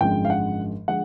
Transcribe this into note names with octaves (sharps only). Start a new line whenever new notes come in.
G#1 F#2 D3 F3 G#3 G5
F5
F#5
D3 F3 G#3 F#5